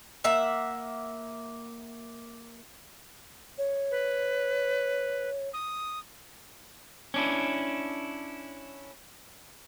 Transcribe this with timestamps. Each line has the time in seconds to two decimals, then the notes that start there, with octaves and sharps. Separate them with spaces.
0.24 A#3 E5 F#5
3.58 C#5
3.91 B4
5.54 D#6
7.14 C#4 D4 E4